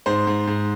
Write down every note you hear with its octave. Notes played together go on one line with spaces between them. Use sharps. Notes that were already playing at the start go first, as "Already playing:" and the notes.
G#2 C5
G#2
G#2